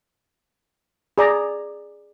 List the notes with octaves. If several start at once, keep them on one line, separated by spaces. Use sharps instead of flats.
G#4 D5 A#5